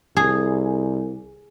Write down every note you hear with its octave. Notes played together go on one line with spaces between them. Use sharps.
C2 G#4